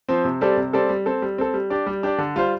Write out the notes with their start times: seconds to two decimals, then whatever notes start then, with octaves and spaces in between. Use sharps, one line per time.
0.09 F3 C4
0.25 C3
0.41 G3 C4 A4 D5
0.57 C3
0.73 G3 C4 A4 D5
0.89 G3
1.06 C4 A4
1.22 G3
1.38 C4 A4
1.54 G3
1.70 D4 G4 D5
1.87 G3
2.03 D4 G4 D5
2.18 D3
2.36 G3 F4 C5